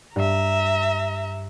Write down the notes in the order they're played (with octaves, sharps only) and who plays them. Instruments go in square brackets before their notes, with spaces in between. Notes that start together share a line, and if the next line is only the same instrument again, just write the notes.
[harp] G2 C7 [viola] E5 A#5